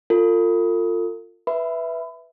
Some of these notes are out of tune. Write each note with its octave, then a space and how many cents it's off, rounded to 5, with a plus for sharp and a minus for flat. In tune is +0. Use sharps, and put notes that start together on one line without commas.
F4 +5 A4 +40
B4 +0 E5 +0 B5 +30